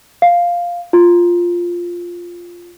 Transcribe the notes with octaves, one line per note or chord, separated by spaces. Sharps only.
F5
F4